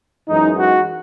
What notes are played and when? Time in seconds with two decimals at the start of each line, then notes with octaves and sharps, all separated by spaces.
0.29 F#2 E3 G#3 D#4
0.59 F#4